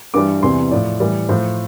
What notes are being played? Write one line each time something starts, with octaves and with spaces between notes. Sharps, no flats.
G2 E3 G3 D6
E2 C3 E3 G3 C6
A2 F3 D5
A2 E3 G3
A2 F3 C5